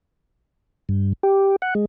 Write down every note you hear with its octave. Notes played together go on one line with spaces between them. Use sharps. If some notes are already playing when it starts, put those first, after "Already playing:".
G2
G4
F#5
G#3